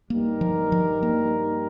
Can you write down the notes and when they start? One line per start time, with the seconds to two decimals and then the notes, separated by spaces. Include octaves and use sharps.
0.10 G2 G3 A#3 D#4 G4 A#4
0.41 F3
0.72 F3
1.03 A#3